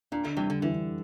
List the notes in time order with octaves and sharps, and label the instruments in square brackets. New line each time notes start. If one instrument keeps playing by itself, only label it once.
[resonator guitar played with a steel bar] A#2 [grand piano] D4
[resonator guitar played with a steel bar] D3
[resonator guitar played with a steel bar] C3 E3 [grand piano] G3
[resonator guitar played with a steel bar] D3
[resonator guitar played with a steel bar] D3 [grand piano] E3